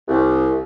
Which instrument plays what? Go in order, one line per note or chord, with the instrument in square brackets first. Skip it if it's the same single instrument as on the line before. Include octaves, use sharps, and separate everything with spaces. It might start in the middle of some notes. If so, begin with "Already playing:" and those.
[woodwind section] C2